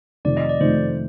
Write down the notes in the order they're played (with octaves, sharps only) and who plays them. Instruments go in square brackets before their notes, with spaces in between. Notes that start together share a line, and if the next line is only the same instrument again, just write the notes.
[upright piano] F2 C3 D#3 A3 [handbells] D5
[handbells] D#5
D5
[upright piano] F2 C3 D#3 A3 [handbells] C5